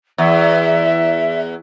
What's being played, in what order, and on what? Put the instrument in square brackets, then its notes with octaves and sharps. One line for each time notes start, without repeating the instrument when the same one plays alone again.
[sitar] E2 [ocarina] E5